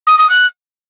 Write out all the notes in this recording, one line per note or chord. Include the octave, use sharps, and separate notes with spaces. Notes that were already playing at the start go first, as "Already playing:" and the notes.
D#6
D#6
F#6